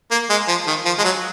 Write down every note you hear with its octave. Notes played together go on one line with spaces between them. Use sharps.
A#3
G#3
F3
D#3
F3
G#3
F#3